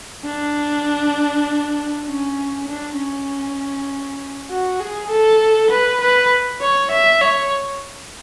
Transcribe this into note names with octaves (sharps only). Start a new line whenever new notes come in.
D4
C#4
D4
C#4
F#4
G#4
A4
B4
B4
C#5
E5
C#5